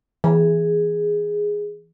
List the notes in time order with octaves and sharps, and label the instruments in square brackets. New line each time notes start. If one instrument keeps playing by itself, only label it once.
[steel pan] E3 [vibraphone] G#4